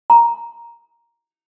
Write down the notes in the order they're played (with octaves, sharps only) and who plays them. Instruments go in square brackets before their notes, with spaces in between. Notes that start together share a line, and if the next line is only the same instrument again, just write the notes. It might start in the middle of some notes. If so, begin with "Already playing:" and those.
[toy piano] A#5